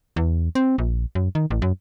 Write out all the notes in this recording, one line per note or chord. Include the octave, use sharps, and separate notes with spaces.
E2
C4
A#1
F#2
D#3
A1
F#2